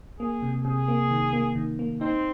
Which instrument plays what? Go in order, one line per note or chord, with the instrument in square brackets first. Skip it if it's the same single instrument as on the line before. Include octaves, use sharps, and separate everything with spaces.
[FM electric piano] A#3 [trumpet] G#4
[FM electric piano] C3
[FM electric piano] C3 [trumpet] G#4
[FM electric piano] A#3
D#3
A#3
D#3
A#3
[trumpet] C4 [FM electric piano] D#4